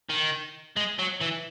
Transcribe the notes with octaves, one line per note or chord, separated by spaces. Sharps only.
D#3
G#3
F#3
E3